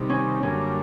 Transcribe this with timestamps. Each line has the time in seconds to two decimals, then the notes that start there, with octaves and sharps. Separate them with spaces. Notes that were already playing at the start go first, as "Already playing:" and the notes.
Already playing: C3 D#3 G3
0.09 C#4
0.43 F#2 D3 G3 A#3 C#4